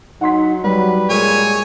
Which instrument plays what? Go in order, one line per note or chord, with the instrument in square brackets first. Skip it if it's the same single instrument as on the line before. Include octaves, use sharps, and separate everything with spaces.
[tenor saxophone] F#3 [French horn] D#4 [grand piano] F#5 C6 B6
[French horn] F#3 [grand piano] G3 [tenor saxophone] B4
[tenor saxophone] A#2 [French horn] G#3 [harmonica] C#5 G#5